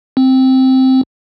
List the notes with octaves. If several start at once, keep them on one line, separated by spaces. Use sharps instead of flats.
C4